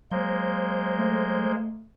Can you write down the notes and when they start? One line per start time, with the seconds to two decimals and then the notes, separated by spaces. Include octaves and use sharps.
0.11 F#3 G#3 A#3 C5 G6
0.99 A3